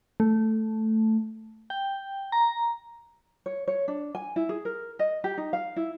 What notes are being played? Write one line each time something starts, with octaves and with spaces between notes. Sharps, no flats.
A3
G5
A#5
C#5
C#5
D4
G#5
E4
G#4
A#4
D#5
G4
D#4
F5
E4